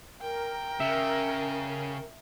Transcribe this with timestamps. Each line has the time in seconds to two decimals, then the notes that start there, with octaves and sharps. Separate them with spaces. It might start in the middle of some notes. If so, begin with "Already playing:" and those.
0.21 A#4 G5
0.80 C#3 E5